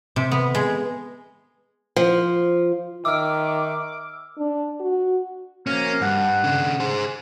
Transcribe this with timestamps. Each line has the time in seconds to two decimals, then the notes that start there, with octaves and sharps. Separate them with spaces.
0.16 C3
0.31 B3
0.55 G#3
1.96 F3
3.05 D#3 E5 D6 E6 F6
4.38 D4
4.80 F#4
5.67 F#2 F3 A#3 C#4
6.02 G2 F#5
6.44 C#3 D4
6.80 G#4 C5